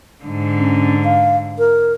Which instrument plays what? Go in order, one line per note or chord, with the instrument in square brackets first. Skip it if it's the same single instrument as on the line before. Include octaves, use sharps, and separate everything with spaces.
[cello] G#2 D3
[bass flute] C#4
F5
A#4